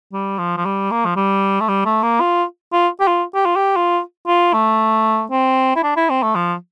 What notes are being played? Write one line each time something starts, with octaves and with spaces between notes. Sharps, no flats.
G3
F3
F3
G3
A#3
F3
G3
A3
G3
A3
A#3
F4
F4
G4
F4
G4
F4
G4
F4
F4
A3
C4
E4
D4
E4
C4
A3
F3